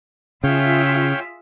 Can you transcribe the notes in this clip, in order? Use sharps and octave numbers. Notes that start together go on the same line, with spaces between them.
C#3 F4 G#4 C#5 E5 F5 G5